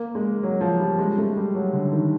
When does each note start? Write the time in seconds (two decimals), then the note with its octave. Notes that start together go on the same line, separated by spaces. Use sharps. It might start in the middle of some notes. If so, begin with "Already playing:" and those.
Already playing: A#3
0.15 G#3
0.43 F#3
0.61 F3
0.80 G3
0.99 G#3
1.18 A3
1.37 G3
1.55 F#3
1.73 D3
1.92 D#3